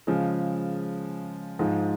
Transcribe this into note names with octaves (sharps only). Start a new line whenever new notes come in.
C#3 F3 G#3
G#2 F3 G#3